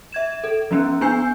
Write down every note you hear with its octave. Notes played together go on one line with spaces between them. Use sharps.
E5 G#6 E7
A4
F3 B3 C#4
B3 D4 G#5 G6 C7